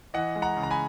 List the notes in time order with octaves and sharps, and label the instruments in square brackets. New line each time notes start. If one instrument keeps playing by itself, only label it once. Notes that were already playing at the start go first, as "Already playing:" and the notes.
[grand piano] E3 D#5 F#5
G#3
F#5 A#5
C#3
A#5
G#5 B5